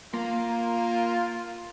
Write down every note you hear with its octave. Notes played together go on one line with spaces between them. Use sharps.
A#3 F4